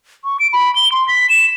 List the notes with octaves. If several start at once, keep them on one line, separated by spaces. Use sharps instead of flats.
C#6
D7
B5
G7
C6
B6
E7